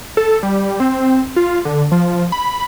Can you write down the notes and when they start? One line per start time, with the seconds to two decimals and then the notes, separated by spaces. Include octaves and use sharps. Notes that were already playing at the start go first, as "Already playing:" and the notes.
0.17 A4
0.43 G3
0.80 C4
1.36 F4
1.65 D3
1.91 F3
2.32 B5